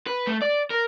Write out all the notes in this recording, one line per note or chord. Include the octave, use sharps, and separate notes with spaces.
B4
A3
D5
A#4